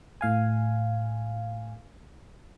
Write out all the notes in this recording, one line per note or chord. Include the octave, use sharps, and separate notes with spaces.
A2 F5 G#5